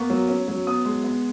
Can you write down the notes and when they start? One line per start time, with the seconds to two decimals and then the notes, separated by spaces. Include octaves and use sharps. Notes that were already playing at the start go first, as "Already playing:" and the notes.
Already playing: A#3 B3 C#6
0.10 F#3
0.29 C#4
0.48 F#3
0.67 B3 D#6
0.85 G#3
1.04 B3